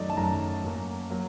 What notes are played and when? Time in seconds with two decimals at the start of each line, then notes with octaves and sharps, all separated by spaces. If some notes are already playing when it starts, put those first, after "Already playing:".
Already playing: F#2 D#3 F#3 A3 D5 D#5
0.10 A5
0.17 F#2 D#3 F#3 A3 A#5
0.64 F#2 F#3 A#3
1.10 F#3 A#3